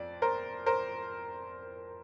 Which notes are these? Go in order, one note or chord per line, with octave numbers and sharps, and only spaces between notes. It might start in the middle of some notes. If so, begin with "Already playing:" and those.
Already playing: F2 D5
A#4 C5
A#4 C5